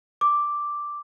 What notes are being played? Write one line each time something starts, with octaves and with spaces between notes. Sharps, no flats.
D6